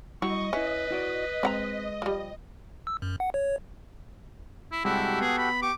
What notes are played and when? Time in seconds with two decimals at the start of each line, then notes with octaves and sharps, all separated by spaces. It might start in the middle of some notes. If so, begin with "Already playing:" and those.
0.22 F#3 G3 E4 D#5 C#6
0.53 C#4 E4 B4 E5
0.91 E4 F#4 D5
1.43 G#3 C4 F#5 A#5
2.02 F3 G3
2.87 E6
3.02 F#2
3.20 F#5
3.34 C#5
4.72 E4
4.85 C3 G3 G#3 E4 F#4 G4 A4
5.21 B3 G#4
5.38 B5
5.62 G4 C#6 D6